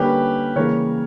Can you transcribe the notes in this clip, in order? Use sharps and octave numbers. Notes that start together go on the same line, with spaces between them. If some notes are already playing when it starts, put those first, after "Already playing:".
Already playing: D3 G3 A#3 C#4 G4 B4
C#3 E3 G3 A#3 A#4 C#5